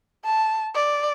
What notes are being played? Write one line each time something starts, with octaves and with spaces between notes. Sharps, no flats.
A5
D5